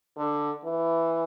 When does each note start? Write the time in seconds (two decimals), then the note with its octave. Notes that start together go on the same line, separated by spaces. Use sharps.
0.17 D3
0.65 E3